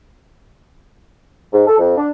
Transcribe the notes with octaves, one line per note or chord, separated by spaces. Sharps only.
G#2
A4
F2
D4